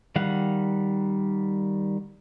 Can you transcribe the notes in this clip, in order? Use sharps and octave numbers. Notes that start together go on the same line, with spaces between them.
D#3 G3 F5 F#5